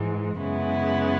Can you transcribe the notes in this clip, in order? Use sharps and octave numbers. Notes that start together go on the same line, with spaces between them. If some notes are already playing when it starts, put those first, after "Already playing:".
Already playing: G#2 E3 G#3
F#2 C#3 G#3 B3 E4